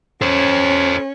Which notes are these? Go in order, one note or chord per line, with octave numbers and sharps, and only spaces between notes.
C#4 A4 C5